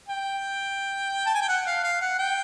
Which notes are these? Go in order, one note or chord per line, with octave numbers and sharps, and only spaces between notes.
G5
A5
G#5
G5
F#5
F5
F5
F#5
G5